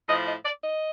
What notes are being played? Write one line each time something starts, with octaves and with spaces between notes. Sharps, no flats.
A2 F3 D#5
D#5
D5
D#5